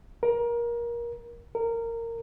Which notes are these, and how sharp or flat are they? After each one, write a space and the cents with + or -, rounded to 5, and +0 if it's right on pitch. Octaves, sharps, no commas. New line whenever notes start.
A#4 +25
A#4 -15